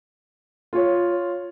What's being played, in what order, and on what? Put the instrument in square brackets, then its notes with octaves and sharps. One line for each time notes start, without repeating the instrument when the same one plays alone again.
[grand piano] F4 C#5